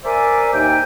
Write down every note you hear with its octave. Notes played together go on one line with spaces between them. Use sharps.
A#4 C5 D5 E5 G#5
D#2 D#4 G5